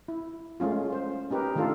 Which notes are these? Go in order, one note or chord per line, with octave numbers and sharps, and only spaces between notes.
E4
G#3 A3 C#4 F4
C5
C#4 D#4 G4 A#4 B4
D#3 A3 D4 F4 A4